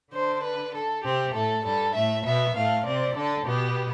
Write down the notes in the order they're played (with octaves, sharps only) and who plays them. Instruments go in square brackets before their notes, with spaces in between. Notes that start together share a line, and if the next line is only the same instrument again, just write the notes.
[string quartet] D3 D4 [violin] C5
[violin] B4
A4
[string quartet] C3 C4 [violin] G4
[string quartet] A2 A3 [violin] A4
[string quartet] G2 G3 [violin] A4
[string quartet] A2 A3 [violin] E5
[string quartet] B2 B3 [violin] E5
[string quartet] A2 A3 [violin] F5
[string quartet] C3 C4 [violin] D5
[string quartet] D3 D4 [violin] A4
[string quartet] B2 B3 [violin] G4